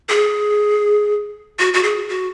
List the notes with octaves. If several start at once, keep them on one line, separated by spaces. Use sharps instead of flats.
G#4
F#4
F#4
G#4
F#4